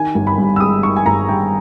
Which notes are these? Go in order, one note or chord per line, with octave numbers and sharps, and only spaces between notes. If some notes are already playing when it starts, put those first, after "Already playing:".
Already playing: D#3 G#5
G1
B5
G2
E6
G#3 D#6
D#3 C#6
G#5
G1 A#5
G2 G5